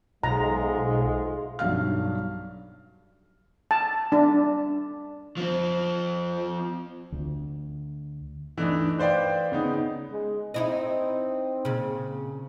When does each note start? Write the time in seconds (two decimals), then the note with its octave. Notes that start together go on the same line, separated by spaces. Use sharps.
0.23 B1 G#2 G#3 A3 F4 A#5
1.59 B1 G2 F#3 F5 F6
3.71 A5
4.12 D4
5.37 F3 C4
7.12 D2
8.58 E3 A3 D4 D#4
8.98 B4 C5 D5 F5 G5
9.52 C#3 B3 D#4
10.11 G#3
10.54 C4 D#4 E4 D#5
11.65 A#2 C#3